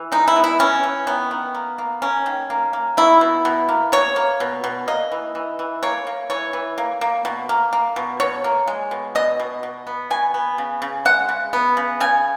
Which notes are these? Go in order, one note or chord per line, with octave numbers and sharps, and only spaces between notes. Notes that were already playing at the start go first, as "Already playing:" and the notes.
Already playing: E3
G#3 D#4
E4
B3
E4
E3 C#4
E3
D#3 B3
D#3
A#3
A#3
A#3 C#4
D#3
A#3
A#3
B2 E4
B2
B2
A#3
B2 C#5
A#3
B2
B2
A#3 D#5
E3
E3
E3
A#3 C#5
A#3
E3 C#5
E3
A#3
A#3
B2
A#3
A#3
B2
B2 C#5
A#3
G#3
B2
B2 D#5
B2
B2
B3
B2 G#5
B3
C#3
C#3
G#3 F#5
C#3
B3
C#3
C#3 G#5